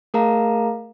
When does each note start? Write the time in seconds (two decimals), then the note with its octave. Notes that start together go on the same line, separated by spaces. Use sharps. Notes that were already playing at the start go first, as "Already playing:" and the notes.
0.14 A3 G#4 A#4 F5 A5 A#5